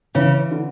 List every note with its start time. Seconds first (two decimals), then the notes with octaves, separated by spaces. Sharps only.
0.15 C#3 E3
0.51 D3